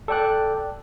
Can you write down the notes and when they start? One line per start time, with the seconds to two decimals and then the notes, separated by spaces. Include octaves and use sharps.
0.08 A4 D5 G5 D6 F#6